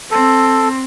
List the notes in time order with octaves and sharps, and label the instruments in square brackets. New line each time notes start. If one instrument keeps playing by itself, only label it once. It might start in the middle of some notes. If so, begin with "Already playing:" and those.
[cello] C4 [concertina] A4